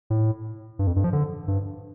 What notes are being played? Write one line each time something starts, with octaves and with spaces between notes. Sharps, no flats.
A2
G2
F2
G2
F3
D3
G2